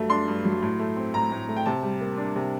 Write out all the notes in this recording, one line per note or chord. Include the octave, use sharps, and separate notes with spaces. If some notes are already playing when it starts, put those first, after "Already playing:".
Already playing: G2 F#3 A3
D4 C6
G2
F#3
A2
A3
C4
A2 A#5
A2
A3
G5
C3 A5
G3
A#3
D4
C3